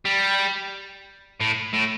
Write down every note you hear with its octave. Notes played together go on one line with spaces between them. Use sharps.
G3
A2
A2